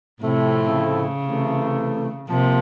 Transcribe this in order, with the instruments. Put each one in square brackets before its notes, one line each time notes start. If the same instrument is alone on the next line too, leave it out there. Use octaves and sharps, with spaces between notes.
[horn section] A2 F3 A3 C4 E4 [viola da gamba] C3
[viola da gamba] C#3
[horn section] C3 E3 A3
[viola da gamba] C3 [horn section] F3 A#3